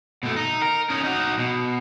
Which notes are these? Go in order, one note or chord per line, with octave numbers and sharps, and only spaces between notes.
B2 A3
D#4
A#4
C#4 D#4
D#4 F#4
B2